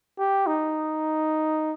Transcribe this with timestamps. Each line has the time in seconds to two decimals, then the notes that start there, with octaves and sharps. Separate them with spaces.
0.19 G4
0.47 D#4